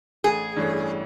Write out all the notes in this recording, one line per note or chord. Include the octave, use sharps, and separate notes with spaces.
A1 G#4
G2 E3 A3 C#4